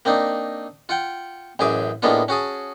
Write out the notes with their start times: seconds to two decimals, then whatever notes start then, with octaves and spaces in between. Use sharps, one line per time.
0.05 A#3 C4 D4 D#4
0.89 F4 F#5 G5
1.59 A1 F#2 G#4 E5 D6
2.02 A2 G#3 A#3 B3 D4 F4
2.28 C#4 F#4 G#4 A5